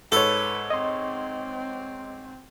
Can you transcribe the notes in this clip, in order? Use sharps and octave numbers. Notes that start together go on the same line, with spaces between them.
G#2 A4 B4 C#5
C4 D#5 C6